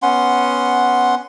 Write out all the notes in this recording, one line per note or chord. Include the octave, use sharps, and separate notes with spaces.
B3 C#4 F#5 C6